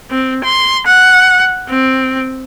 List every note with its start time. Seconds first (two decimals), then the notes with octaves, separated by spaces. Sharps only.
0.10 C4
0.45 C6
0.86 F#5
1.69 C4